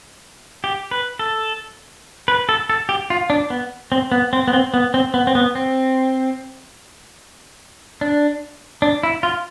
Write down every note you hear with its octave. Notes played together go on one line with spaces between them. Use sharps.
G4
B4
A4
B4
A4
A4
G4
F4
D4
B3
C4
B3
C4
B3
C4
B3
C4
B3
C4
B3
C4
D4
D4
E4
F4